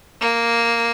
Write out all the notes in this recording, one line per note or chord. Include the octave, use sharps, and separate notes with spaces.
A#3